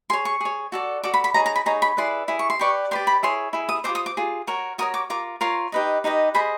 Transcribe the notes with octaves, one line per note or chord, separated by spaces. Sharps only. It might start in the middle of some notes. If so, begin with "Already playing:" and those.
G#4 C#5 C6
C#6
G#4 C#5
F#4 A4 D5
F#4 A4 D5 D6
B5
B5
D#4 G#4 C#5 A#5
A#5
B5
D#4 G#4 C#5 A#5
B5
E4 G#4 B4 D5 C6
E4 G#4
C#6
C6
G4 B4 D5 C#6
G4 B4 D5 C6
B5
E4 G#4 C#5 C6
E4 G#4
D#6
F4 G#4 C5 D6
D#6
D6
F4 G#4
F#4 A#4 C#5
F#4 A#4 C#5 D#6
D6
F4 A#4 D6
F4 A#4 C#5 C6
D#4 G4 B4 D#5
D#4 G4 B4 D#5
G#4 C5 D#5 B5